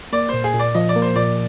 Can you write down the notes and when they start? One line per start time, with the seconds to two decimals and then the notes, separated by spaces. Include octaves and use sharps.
0.13 A#3 D5
0.29 A#2 C5
0.44 G#4
0.54 A#2
0.59 D5
0.75 F3 D#5
0.89 D5
0.96 A#3
1.02 C5
1.16 A#2 D5